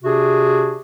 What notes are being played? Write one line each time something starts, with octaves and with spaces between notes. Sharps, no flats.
C3 D4 F#4 G#4